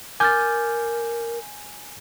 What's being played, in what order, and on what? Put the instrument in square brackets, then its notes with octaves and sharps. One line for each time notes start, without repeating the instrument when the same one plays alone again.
[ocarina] A#4 [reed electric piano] G#5 G6 [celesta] D6 F6 A6